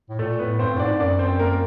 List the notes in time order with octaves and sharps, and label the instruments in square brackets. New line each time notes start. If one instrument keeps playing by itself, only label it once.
[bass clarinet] A2
[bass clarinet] A#2 [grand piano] A3 A4
[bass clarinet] A2 [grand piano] B3 B4
[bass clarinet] G2 [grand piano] C4 C5
[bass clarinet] A2
[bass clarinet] G#2 [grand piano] D4 D5
[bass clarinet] F#2 [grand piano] D4 D5
[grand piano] C4 C5
A#3 A#4